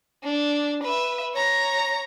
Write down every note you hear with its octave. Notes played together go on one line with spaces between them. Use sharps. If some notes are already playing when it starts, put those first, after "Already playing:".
D4
B4 E5
C#5 A#5